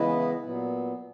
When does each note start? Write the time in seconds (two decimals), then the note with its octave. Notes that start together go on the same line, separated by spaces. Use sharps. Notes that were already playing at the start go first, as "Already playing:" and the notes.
Already playing: C#3 E3 G#3 B3 E4 B4 D#5
0.44 A#2 F#3 B3